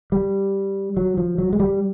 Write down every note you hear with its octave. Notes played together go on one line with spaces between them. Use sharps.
G3
F#3
F3
F#3
G#3
G3